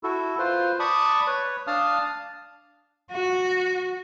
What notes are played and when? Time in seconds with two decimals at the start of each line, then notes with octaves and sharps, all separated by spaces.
0.03 E4 F#4 A4
0.39 F4 B4 C5
0.80 D5 A5 B5 C#6 D#6
1.27 B4 C#5
1.67 D4 F5 A5 D#6 F6
3.12 F#4